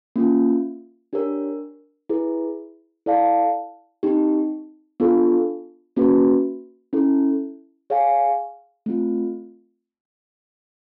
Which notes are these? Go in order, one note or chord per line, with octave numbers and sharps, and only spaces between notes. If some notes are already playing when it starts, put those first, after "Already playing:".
A#3 C#4 F4
D4 G4 A#4 C#5
E4 G#4 B4
E4 A4 D5 F5 A5
C4 D#4 G4
B3 D4 F4 A4
A#3 C#4 F#4 B4
C#4 E4 A4
G#4 C#5 F5 G#5
A3 C4 F4